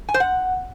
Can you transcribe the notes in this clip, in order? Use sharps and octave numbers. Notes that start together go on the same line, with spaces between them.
G#5
C5
F#5